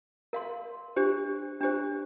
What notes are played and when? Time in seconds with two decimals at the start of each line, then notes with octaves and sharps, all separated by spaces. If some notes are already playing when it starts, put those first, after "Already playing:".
0.33 A#4 F5 C6
0.96 D4 G4 C5
1.61 D4 G4 C5